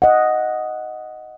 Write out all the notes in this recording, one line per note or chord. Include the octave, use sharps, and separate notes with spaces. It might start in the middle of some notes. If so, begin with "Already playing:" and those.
D#5 F#5